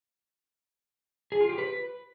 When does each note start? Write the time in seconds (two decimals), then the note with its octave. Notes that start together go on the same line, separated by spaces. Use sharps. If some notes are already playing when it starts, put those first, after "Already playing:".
1.32 G#4
1.41 F4
1.49 G4
1.58 B4